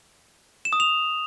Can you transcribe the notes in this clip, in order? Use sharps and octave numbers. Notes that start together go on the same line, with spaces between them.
E7
D#6
F7